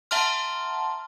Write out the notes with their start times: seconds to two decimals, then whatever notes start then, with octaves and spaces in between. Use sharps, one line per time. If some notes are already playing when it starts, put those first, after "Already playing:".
0.11 E5 F#5 A5 A#5 C6 F6